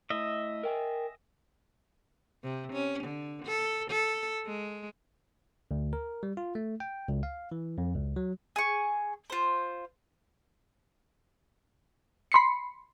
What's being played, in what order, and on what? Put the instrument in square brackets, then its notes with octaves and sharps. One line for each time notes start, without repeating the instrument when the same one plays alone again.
[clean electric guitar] A2 [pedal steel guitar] D#5 E5
[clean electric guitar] A#4 G5 G#5
[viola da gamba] C3
C#4
D3
A4
A4
G#3
[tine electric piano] D2
A#4
G3
F4
A3
G5
C#2
F5
E3
F2
C#2
F#3
[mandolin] G#4 C#6
F4 C5
[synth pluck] B5 C6 C7 C#7